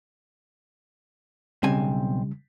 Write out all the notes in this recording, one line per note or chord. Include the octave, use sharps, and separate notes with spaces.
B1 C#3 G3 C4 G#5